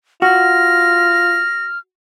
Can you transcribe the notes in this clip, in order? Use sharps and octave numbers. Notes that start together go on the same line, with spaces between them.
F4 F#4 F6 A#6